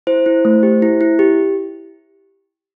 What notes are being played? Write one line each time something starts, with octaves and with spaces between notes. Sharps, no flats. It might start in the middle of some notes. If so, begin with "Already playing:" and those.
E4 C5
E4
A3
G4
E4
E4
G4